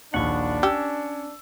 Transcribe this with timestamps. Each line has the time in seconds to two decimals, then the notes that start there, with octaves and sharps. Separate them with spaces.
0.14 A#1 D#2 D4 F#5 C#6
0.63 C#4 G4 E6